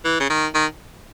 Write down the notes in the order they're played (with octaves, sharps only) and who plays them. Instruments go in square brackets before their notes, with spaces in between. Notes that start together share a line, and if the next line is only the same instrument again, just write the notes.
[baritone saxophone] E3
C#3
D#3
D#3